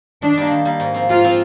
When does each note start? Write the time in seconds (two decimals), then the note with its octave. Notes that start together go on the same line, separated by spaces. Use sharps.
0.22 D#3 D4
0.37 G3 A#3
0.51 D#3
0.65 G3 A#3
0.80 G#2
0.94 F3 C4
1.09 G#2 F4
1.24 F3 C4